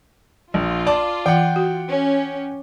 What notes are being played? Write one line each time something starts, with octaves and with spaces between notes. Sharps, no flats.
A#1 F4
D5 A5 D6
E3 F#5 G5
F#4
C#4